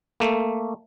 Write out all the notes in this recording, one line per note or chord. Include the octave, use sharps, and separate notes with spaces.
A3 A#3